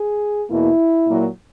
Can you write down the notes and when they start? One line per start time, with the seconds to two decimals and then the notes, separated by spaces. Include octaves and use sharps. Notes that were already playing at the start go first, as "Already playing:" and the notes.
Already playing: G#4
0.50 E2 B2 A#3 E4
1.07 A#2 F#3 A#3